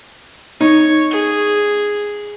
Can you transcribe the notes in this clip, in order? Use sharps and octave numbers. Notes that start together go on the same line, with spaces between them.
D#4 C#5
G#4